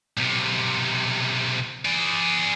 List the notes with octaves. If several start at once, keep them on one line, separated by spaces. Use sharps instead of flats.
B1 C3
G#4 D5